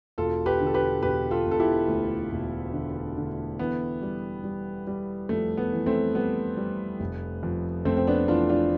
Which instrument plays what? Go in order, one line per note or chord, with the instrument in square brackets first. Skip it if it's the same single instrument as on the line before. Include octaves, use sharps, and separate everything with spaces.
[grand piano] E1 F4 A4
G4 B4
D3
A4
G4 B4
E1 G4 B4
F4 A4
E1
A4
E4 G4
D2
E1
D3
D3
E3 B3
G3
G3
G3
F2 A3
B3
E3
A3 C4
G3 B3
G3
F1
F2
F2 A3 C4
C4
B3 D4
E3 D4 F4
D4 F4